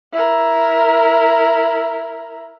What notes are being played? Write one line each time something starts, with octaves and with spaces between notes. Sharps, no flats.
E4 A#4